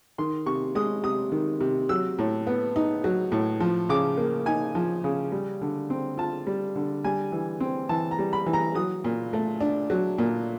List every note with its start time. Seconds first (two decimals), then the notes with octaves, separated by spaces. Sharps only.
0.18 D#3 C6
0.46 C3 C#6
0.75 G#3 D#6
1.03 C3 D#6
1.32 D#3
1.60 C3
1.89 F#3 E6
2.19 A2
2.47 B3
2.76 D#4
3.04 F#3
3.32 A2
3.60 F3
3.89 C#3 D6
4.18 A#3
4.46 D#4 G#5
4.75 F3
5.04 C#3
5.32 G3
5.61 D3
5.90 C4
6.18 F4 A5
6.47 G3
6.76 D3
7.04 G3 G#5
7.32 E3
7.60 C4
7.89 E3 A5
8.11 A#5
8.19 G3
8.33 B5
8.46 E3
8.53 A#5
8.75 F#3 D#6
9.04 A#2
9.33 A3
9.60 D4
9.90 F#3
10.18 A#2